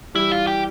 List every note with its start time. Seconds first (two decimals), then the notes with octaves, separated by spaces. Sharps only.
0.15 E3 G3 E4
0.32 F4
0.47 G4